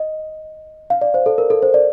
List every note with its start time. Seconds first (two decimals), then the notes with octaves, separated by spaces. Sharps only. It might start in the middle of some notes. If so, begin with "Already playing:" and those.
Already playing: D#5
0.90 F5
1.01 D5
1.14 C5
1.26 A4
1.38 A#4
1.50 A4
1.62 C5
1.74 D5